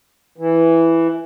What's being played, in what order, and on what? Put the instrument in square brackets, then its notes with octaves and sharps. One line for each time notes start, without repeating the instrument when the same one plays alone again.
[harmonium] E3